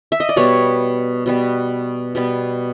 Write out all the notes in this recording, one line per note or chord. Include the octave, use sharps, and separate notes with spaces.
E5
D#5
D5
B2 G3 B3 C#5
B2 G3 B3
B2 G3 B3